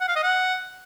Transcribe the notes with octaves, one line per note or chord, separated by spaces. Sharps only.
F#5
F5
D#5
F#5